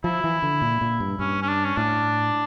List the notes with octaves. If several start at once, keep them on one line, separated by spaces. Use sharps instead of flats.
F3 E4
E3
D3
A#2
A#2
G2
G2 C#4
C#4
D4
C#4
A2 D4